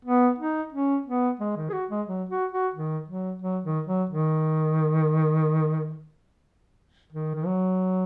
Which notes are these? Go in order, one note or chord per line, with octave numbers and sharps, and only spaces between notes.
B3
D#4
C#4
B3
G#3
D#3
G#4
F#4
G#3
F#3
F#4
F#4
D#3
F#3
F#3
D#3
F#3
D#3
D#3
D#3
F#3